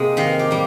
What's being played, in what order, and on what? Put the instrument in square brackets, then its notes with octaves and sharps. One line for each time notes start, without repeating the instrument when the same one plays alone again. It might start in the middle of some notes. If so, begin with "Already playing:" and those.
Already playing: [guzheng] C3 G#3 A#3
D#3 F5
G4
G3 A#3